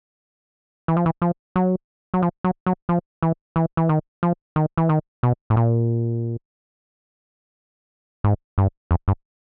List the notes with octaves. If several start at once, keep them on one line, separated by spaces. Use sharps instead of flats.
E3
F3
E3
F3
F#3
F#3
F3
F#3
F#3
F3
E3
E3
E3
D#3
F3
D#3
E3
D#3
B2
A2
A#2
G#2
G2
F2
G2